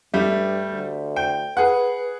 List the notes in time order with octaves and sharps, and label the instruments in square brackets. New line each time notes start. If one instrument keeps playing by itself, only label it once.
[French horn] G2 [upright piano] G3 A3
[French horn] D2
[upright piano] G5
[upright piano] G#4 F#5 [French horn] B4